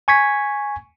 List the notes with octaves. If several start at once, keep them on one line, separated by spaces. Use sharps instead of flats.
G#5 C#6 G#6 B6